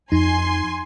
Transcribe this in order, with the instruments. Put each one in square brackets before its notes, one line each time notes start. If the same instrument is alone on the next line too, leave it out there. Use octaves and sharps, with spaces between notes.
[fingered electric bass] F2 [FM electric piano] D#4 [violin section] G#5 C6